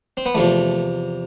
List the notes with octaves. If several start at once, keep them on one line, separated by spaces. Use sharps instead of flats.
C4
B3
E2 C3 F3 A3